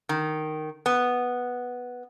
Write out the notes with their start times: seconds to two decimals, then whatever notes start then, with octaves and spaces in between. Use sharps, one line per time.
0.09 D#3
0.86 B3